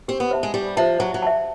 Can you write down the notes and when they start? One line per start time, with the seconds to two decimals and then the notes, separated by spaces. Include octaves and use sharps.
0.08 C4 G4
0.20 B3
0.31 C5 E5 A5
0.43 G#3
0.54 G3 G4
0.77 F3 C5 E5 A5
0.99 F#3 C5
1.14 F#3
1.22 E5 A5